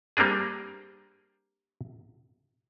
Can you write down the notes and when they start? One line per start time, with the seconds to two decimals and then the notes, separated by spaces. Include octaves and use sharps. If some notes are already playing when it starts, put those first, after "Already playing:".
0.17 G3 A#3 C4 D4 G#4